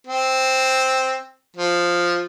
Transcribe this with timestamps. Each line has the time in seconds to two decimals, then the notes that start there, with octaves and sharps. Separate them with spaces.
0.07 C4
1.57 F3